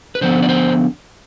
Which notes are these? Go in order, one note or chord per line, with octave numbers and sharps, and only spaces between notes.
B4
D3 F3 B3 C5
D5
C5